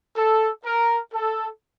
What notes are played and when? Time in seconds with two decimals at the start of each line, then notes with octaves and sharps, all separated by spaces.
0.17 A4
0.66 A#4
1.14 A4